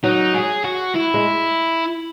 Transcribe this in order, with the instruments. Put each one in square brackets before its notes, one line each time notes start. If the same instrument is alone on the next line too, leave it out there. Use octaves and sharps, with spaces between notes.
[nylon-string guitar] F#3 [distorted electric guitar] D#4
[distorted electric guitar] G#4
F#4
E4
[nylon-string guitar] G#3